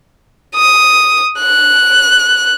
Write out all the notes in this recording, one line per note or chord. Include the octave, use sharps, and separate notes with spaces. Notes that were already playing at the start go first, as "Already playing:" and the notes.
D#6
F#6